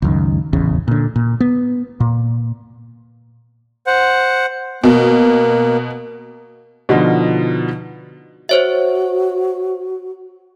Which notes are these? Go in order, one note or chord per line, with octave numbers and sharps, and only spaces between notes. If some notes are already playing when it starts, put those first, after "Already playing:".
C#2 F#2 D#3
D#1 A1 E2 C#3
A#2 D3
A#2
B3
A#2
C5 F#5
B2 A#3
B2 D3 F3 D#4 F4
F#4 C5 C#5 E5